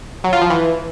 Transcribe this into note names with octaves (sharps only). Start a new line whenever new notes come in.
F#3
F4
F3
E3